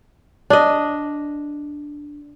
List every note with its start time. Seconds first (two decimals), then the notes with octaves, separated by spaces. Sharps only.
0.50 D4 D#5